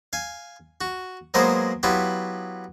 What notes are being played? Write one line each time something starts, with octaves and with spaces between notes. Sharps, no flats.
F5 G#5
F#4
F#3 G#3 A#3 B3 A#4 C5
F#3 B3 E4 F4 G4